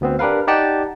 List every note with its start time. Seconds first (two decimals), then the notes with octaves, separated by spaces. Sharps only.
0.01 D2 B3 C4
0.19 D4 G4 A#4 B4 F5
0.47 D#4 G4 D5 F#5 G5 A5